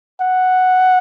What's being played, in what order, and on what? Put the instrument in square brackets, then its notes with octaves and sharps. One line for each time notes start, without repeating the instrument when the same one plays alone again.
[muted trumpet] F#5